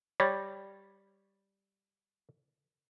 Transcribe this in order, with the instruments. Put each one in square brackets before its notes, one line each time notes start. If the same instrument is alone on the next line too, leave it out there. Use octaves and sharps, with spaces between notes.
[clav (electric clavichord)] G3 [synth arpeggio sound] C#5 A6 A#6